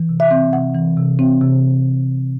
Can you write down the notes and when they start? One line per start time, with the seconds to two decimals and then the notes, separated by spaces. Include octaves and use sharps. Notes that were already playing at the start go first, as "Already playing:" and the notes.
Already playing: E3
0.09 C3
0.20 E5
0.31 C4
0.53 C3 F#5
0.75 E3
0.97 C3
1.19 C4
1.41 C3